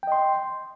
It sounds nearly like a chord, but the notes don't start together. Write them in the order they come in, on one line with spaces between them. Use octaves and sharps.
G5 D#5 C6